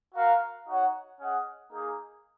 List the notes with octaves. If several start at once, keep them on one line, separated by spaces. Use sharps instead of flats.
F#4 A#4 F5
D#4 F#4 C#5 F#5
C#4 G#4 D#5 F#5
A#3 D#4 G#4